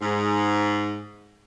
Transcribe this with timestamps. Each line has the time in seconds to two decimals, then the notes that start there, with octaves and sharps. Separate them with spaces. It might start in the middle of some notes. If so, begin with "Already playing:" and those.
0.01 G#2